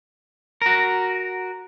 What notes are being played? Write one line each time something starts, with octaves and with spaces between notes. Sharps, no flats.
F#4 A#4